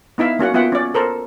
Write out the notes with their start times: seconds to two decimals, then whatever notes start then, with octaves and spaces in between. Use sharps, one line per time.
0.18 B3 D#4 E4 E5 F5
0.39 A#3 C#4 F#4 F#5
0.54 B3 F4 E5 F#5 G5
0.72 C#4 D5
0.94 A4 A#4 C5